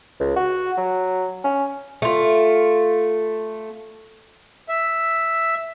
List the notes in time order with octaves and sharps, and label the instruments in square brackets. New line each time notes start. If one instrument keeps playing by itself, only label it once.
[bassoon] C#2
F#4
F#3
C#4
[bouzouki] A3 F4
[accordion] E5